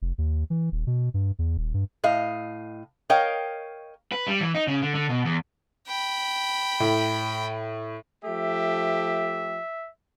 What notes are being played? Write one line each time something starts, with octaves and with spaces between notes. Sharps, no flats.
F1
D#2
E3
D#1
B2
G2
E2
D#1
G2
A2 D#5 F5
A#4 C#5 D#5 F5 G5
B4
G3
E3
D#4
C#3
D3
D3
B2
E2
G5 B5
A2
F3 A3 G4 E5